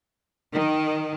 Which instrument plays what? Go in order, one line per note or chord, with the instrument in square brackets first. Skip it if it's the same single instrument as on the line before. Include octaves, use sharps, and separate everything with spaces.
[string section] D#3